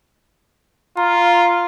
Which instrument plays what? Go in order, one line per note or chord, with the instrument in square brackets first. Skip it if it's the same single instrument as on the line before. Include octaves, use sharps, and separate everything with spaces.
[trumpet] F4 [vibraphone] A#5